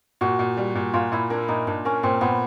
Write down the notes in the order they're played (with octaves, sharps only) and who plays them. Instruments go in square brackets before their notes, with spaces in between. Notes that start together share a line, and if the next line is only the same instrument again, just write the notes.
[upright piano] A#2 [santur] F#4
[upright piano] A#2
G3
A#2
[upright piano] A#2 [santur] F4
[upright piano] A#2 [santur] E4
[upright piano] A#3 [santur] D4
[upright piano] A#2 [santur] D#4
[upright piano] A#2 [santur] D4
[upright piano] A#3 [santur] C#4
[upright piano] A#2 [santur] C4
[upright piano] A#2 [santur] B3